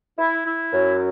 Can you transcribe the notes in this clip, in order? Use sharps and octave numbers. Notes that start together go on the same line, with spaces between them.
E4
E4
F#2